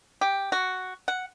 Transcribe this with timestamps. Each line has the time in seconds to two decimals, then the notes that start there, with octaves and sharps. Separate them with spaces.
0.21 G4
0.52 F#4
1.08 F#5